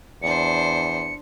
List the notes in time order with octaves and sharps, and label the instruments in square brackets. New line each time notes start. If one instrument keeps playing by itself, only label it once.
[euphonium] E2 [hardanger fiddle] D4 C5 [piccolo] C#7